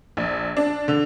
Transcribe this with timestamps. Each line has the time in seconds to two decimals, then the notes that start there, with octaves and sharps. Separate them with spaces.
0.17 A#1
0.57 D4
0.88 D3